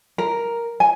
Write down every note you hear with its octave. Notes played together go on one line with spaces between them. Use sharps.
A#4
G#5